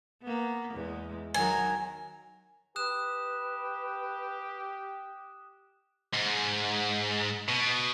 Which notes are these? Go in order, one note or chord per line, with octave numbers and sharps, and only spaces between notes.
A#3 B3
E2 G#3
D#3 F#3 A#4 G#5
G4 B4 D#6 F#6 E7
G#2
B2